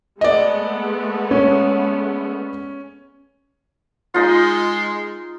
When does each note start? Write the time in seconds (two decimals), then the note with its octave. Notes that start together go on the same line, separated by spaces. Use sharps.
0.21 G#3 A3 B3 D5 D#5
1.31 C#4
4.14 G#3 D#4 F4 C6